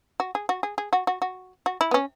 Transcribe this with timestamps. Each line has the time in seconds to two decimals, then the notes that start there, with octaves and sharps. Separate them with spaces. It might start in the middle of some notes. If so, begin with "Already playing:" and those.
0.20 F#4
0.35 G#4
0.49 F#4
0.63 G#4
0.78 G#4
0.93 F#4
1.07 F#4
1.22 F#4
1.66 F#4
1.81 E4
1.91 B3
1.94 C#4